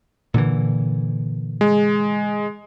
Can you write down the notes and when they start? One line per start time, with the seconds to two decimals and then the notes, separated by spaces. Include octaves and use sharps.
0.34 A#2 D3 E3
1.61 G#3